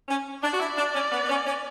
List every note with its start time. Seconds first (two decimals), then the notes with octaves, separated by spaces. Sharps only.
0.08 C#4
0.43 D4 D5
0.53 F#4
0.60 E4
0.77 D4
0.95 C#4
1.12 B3
1.24 B3
1.29 C#4
1.46 C#4